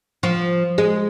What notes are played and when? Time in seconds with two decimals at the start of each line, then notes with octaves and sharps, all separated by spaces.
0.23 F3
0.78 G#3